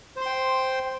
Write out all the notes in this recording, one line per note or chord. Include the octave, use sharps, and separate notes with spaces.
C5 G5 C6